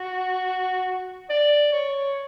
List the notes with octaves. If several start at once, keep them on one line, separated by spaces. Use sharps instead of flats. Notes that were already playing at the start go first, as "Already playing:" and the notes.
Already playing: F#4
D5
C#5